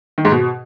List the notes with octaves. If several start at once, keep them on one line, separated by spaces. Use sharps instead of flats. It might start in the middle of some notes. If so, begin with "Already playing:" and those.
D#3
G#2
B2